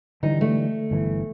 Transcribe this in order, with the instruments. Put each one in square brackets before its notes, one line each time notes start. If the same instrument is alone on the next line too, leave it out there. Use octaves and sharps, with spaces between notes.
[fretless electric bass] D3 E3 G3 [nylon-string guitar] D#4
[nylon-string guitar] A3
[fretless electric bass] G1 A#2 E3